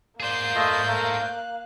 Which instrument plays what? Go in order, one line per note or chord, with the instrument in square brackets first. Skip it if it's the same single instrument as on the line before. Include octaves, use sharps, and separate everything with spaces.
[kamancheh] A#3 F5 [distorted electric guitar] G#4 C5 [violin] D5 G6
[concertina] A3 F4 D#5
A3 A#4
F#6